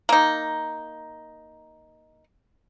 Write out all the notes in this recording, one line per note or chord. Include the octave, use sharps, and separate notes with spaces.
A#3 D#4